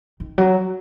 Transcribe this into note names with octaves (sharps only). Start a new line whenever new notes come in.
D#3
F#3